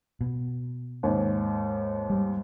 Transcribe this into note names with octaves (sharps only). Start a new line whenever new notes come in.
B2
D#2 G#2
G3